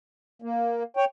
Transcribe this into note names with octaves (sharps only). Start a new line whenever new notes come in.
A#3
C#5 G5